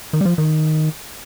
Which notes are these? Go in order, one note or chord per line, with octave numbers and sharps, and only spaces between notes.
D#3
G3
F3
D#3